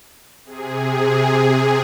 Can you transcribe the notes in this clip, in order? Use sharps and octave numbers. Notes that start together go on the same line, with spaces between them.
C3 G#4